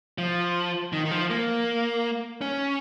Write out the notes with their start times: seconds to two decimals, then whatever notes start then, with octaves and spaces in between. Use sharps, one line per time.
0.18 F3
0.93 D#3
1.05 D#3
1.11 F3
1.30 A#3
2.41 C#4